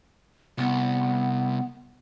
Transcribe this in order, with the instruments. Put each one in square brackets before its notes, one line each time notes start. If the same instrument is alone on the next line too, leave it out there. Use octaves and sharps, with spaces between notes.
[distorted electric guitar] C2 [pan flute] B3